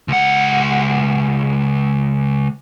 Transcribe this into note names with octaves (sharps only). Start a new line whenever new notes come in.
C#2 F#5